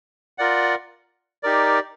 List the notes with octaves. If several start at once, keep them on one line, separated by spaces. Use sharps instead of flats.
F4 A#4 D5 F#5
D#4 G4 A#4 D5